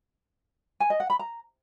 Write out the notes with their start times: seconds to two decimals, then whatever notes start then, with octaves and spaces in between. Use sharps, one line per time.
0.80 G#5
0.90 D#5
1.00 F#5
1.10 B5
1.19 A#5